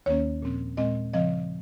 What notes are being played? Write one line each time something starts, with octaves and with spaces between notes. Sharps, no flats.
D#2 D#3 A#3 C#4 C#5
A#2 F3 C4
A#2 G#3 C4 D#5
C#3 F3 C4 D#5